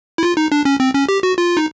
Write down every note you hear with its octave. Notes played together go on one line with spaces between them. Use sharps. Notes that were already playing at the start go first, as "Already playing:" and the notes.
E4
F4
D#4
D4
C#4
C4
C#4
G4
F#4
F4
D#4